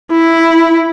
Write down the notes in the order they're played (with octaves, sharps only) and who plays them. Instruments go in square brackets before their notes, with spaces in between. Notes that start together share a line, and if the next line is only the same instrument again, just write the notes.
[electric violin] E4